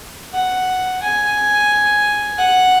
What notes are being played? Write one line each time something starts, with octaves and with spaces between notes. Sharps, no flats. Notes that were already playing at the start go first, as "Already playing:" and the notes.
F#5
G#5
F#5